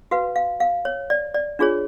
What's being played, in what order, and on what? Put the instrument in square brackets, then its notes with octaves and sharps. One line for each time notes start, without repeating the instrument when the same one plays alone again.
[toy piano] F#4 B4 F5
F5
F5
C#5
D5
D5
D4 F4 G#4 C#5